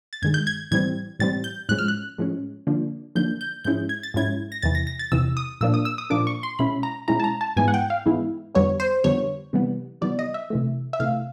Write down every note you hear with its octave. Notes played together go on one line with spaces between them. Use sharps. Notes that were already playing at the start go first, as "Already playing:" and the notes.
A6
G2 D#3 G#3 G#6
G6
G#6
A2 E3 G3 C4 G#6
A2 E3 G3 C4 A6
G6
A2 F3 G#3 C#4 F#6
F6
F#6
A2 F3 G#3 C#4
D3 F3 A#3 D4
D3 F3 A#3 D4 G6
G6
G#2 F3 G#3 C#4 E4 G6
G#6
A6
G#2 F3 G#3 C#4 E4 G#6
A#6
E2 C3 E3 A6
A#6
A#6
A6
E2 C3 E3 E6
D#6
A#2 F3 A#3 D4 E6
D#6
E6
D#6
A#2 F3 A#3 D4 D6
C#6
C6
B2 G#3 C#4 E4 B5
A#5
B2 G#3 C#4 E4 A#5
A5
A#5
A5
G#2 E3 G#3 B3 E4 G#5
F#5
G5
F5
G#2 E3 G#3 B3 E4
F2 D3 G3 B3 C#5
C5
F2 D3 G3 B3 C#5
C3 E3 G3 B3
C3 E3 G3 B3 D5
D#5
E5
C3 E3 A3
E5
C3 E3 A3 F5